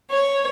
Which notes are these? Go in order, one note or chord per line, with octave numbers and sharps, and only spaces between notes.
C#5